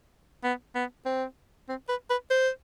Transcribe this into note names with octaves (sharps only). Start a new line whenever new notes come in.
B3
B3
C4
C4
B4
B4
C5